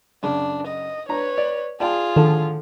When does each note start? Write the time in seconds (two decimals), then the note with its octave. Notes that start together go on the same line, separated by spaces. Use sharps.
0.23 F#2 C#3 D4
0.68 D#5
1.09 D4 B4 C#5 A#5
1.38 D5
1.80 F4 G#4 D5 G5 A5
2.16 A2 D3 D#3 F3 A4